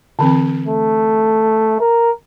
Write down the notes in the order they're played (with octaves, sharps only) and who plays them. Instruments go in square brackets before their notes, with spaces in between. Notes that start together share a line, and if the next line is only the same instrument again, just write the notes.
[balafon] D3 E3 C4
[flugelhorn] A3
A#4